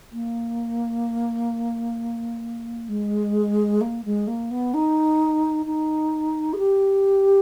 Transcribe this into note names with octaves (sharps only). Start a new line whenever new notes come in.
A#3
G#3
A#3
G#3
A#3
B3
D#4
D#4
G#4
G4